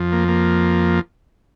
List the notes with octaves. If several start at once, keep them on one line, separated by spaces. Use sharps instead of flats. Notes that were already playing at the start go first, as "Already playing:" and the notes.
Already playing: F2 F3
A#3
A#3